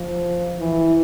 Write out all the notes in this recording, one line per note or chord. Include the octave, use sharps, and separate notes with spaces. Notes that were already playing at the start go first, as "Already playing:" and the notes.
Already playing: F3
E3